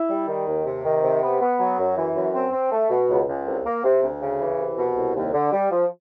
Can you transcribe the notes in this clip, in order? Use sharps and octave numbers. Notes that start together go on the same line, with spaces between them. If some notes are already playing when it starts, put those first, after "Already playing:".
Already playing: E4
G3
D#3
D#2
C3
D#3
C3
B3
B3
F#3
F#2
E3
F#2
C4
C4
A3
B2
C#2
C#2
C2
A#3
C3
D2
C#3
E3
C2
B2
C2
D#2
D3
G3
F3